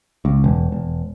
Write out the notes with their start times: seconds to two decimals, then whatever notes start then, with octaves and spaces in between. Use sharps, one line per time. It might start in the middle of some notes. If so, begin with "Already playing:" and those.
0.25 C#2
0.44 E1
0.72 E1